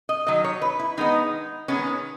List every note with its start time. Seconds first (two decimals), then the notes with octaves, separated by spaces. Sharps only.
0.09 D#5
0.27 D#3 F#3 D#5
0.44 C#5
0.61 B4
0.79 E4
0.97 D#3 G#3 B3 D#4
1.68 D#3 G#3 B3 C#4